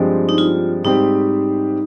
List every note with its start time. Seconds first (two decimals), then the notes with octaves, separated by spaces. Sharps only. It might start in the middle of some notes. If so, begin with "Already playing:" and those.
Already playing: G2 F3 G#3 C4 G4
0.29 D#4
0.38 F4
0.84 G#2 G3 C4 D#4 G4 C5